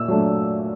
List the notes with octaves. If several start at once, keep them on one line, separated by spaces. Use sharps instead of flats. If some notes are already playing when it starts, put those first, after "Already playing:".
Already playing: A#2 E6
F#3 A3 D4